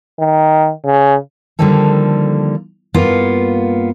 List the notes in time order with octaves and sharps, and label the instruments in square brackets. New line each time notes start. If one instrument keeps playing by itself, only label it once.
[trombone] D#3
C#3
[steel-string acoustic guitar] D3 D#3 F3 G3 A#3 A4
G2 A#3 B3 F4 F5